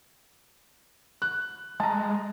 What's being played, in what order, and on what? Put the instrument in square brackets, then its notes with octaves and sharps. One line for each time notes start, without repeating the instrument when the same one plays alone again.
[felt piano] F#6
[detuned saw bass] G#3 [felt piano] A5 A#5